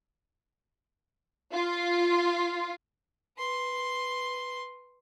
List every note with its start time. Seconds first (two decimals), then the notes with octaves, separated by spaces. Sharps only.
1.52 F4
3.38 B4 C6